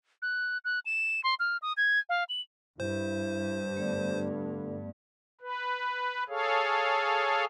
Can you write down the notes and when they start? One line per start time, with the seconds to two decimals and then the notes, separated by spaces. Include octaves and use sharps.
0.22 F#6
0.65 F#6
0.86 E7
1.24 C6
1.40 F6
1.62 D#6
1.77 G#6
2.09 F5
2.29 F#7
2.80 G2 E4 C5
3.77 D3 A3 B3 D5
5.41 B4
6.29 G#4 A4 C#5 F5